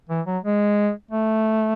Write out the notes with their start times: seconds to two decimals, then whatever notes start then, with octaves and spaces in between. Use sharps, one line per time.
0.10 E3
0.26 F#3
0.43 G#3
1.11 A3